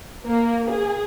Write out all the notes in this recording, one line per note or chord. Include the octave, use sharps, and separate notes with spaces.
A#3
G#4